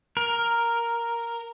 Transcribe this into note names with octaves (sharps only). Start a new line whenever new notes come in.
A#4